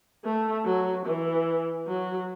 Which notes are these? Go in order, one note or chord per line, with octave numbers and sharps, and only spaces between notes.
A3
F#3
E3
F#3